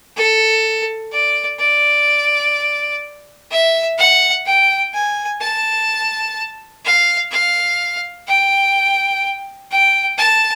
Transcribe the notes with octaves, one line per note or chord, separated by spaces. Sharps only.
A4
D5
D5
E5
F#5
G5
G#5
A5
F5
F5
G5
G5
A5